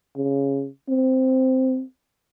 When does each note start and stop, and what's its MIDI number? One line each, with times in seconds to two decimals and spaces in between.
0.17 0.67 49
0.89 1.83 60